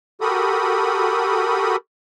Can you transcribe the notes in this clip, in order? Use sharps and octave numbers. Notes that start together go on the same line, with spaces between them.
F#4 G4 A4 A#4 B5 D#6